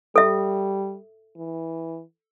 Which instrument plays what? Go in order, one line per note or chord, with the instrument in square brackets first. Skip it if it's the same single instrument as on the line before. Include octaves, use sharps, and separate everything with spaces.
[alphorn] G3 [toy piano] A4 E5
[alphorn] E3